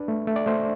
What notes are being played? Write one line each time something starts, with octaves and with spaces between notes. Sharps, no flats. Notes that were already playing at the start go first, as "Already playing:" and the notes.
Already playing: D4 B4
A3
A3
D5
A3 C5